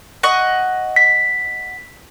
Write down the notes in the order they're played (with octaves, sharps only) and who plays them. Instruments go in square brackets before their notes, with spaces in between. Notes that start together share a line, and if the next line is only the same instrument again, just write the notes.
[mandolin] D#5 F#5 C#6
[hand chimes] B6